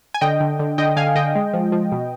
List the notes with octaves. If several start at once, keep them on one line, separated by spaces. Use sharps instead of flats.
G#5
D3 D#5 G5
D3
D3
D3 D#5 G5
D3 F5 G#5
D3 D#5 G5
G#3
F3
F3
B2